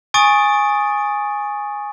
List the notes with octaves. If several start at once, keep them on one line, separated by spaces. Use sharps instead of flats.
G#5 C#6 D#6 A6 D7